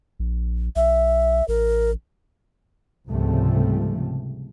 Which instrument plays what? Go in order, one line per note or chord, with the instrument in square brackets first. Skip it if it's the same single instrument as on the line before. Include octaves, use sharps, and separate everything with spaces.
[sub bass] A#1
[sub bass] B1 [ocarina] E5
[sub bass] A1 [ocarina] A#4
[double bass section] C#2 G#2 C3 F3 G3 A3